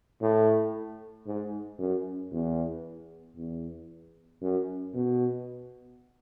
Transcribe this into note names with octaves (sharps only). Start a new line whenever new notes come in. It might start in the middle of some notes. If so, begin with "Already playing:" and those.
A2
G#2
F#2
E2
E2
F#2
B2